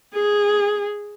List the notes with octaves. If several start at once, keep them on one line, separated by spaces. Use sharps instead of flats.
G#4